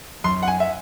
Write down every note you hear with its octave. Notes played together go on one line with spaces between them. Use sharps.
F#2 C6
F#5
G#5
E5